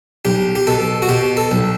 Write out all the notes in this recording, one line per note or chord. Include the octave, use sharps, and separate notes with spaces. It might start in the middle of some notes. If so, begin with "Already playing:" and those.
B1 G4
G4
B2 A4
F#4
B2 G4
A4
B1